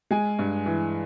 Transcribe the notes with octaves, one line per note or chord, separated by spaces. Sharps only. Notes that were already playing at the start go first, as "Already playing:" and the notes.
G#3 G#5
G2
E3